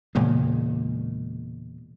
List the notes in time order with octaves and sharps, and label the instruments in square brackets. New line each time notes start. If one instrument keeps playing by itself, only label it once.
[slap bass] E1 A#2 C#3 G#3